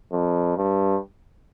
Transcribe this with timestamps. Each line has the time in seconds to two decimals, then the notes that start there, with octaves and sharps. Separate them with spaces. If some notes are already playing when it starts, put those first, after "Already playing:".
0.13 F2
0.57 G2